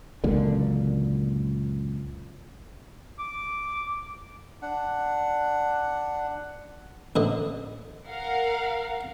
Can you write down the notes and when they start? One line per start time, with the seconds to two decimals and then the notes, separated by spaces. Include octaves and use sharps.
0.24 C#2 F#2 A#2 D3
3.19 D6
4.62 D4 F#5
7.16 A1 D3 D#5
8.07 A#4 F5 F#5